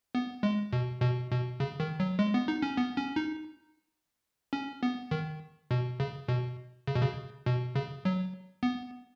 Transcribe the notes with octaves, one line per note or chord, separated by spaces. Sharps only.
B3
G#3
B2
B2
B2
C#3
D#3
F#3
G#3
B3
D#4
C#4
B3
C#4
D#4
C#4
B3
D#3
B2
C#3
B2
C#3
B2
C#3
B2
C#3
F#3
B3